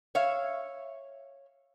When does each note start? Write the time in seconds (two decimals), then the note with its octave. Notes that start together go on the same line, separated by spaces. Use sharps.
0.15 C#5 E5 F5